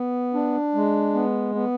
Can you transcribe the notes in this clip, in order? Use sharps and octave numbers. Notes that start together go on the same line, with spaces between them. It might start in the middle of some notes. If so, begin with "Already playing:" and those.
Already playing: B3
D4
G#3
B3
B3